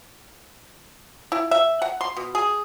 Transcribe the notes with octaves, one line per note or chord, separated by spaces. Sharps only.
E4
E5
F#5
C6
B2
G#4